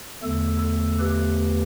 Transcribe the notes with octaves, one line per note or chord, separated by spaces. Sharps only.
E2 D3 A3 A4
A4
G4 B4